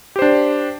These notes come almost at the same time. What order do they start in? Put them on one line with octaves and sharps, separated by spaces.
G4 C5 D4